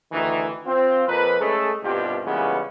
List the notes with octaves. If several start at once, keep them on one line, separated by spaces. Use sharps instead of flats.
D2 D#3 E3
C4 F4
F2 A#2 F3 A#4 B4
G#3 A3 C#4 G#4 A4
C2 G2 B2 F4 G4
A#2 C#3 E3 G3 G#3 B3